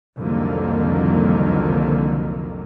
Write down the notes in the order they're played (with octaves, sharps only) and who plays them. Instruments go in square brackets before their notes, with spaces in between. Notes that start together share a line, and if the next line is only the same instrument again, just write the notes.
[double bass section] C2 F2 D3 D#3 F#3 A#3